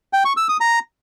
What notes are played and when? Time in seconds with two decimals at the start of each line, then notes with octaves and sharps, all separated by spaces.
0.13 G5
0.25 C#6
0.37 E6
0.49 D#6
0.60 A#5